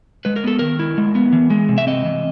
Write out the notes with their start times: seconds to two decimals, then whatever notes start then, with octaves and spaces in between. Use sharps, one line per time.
0.25 G#3 B4
0.36 A#4
0.44 B3 A4
0.59 D#3 A#4
0.79 E4
0.98 G#3
1.15 B3
1.33 E3
1.50 G#3
1.69 C3
1.78 E5
1.87 C4 D#5
2.05 E3